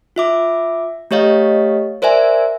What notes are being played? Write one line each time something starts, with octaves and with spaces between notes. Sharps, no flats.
F4 E5 D6
A3 G4 C#5 D#5 F5
A#4 C5 D5 E5 G#5